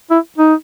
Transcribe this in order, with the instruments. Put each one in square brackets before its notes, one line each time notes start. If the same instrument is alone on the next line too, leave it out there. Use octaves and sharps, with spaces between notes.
[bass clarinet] E4
D#4